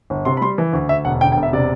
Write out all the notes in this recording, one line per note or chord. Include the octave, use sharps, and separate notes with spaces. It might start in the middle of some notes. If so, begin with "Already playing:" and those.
G1
C3 C6
B5
G3 C6
E3
D2
D2 E5
E1 F#5
D3 G5
G5
E1
E5
C3 D5